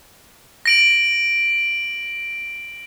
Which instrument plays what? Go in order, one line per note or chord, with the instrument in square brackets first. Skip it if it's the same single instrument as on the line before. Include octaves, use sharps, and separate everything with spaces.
[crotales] A#6 D7 F#7